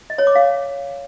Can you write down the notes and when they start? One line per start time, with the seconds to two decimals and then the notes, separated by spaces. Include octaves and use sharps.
0.10 D#5
0.18 C#5
0.27 D6
0.36 F5